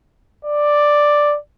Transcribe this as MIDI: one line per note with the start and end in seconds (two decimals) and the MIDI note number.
0.45 1.35 74